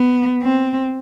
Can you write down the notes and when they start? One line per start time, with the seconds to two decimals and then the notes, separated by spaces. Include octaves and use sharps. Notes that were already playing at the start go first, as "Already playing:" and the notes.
Already playing: B3
0.42 C4